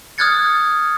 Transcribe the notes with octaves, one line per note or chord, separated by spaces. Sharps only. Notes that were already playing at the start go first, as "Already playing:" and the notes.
D#6 F6 F#6 G#6 A6 C#7